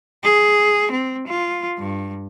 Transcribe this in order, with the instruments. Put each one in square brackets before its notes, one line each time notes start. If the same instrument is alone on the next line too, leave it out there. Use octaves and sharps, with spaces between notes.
[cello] G#4
C4
F4
G2